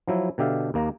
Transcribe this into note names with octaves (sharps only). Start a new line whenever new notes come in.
F3 F#3 E4
B2 D3 G4 E5 F5
D#2 A#3 A#5